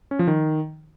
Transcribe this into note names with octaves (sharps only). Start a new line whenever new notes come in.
C#4
F3
D#3